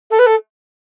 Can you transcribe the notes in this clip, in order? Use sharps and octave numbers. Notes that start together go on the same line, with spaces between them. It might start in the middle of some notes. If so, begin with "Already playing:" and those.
A4
B4
A4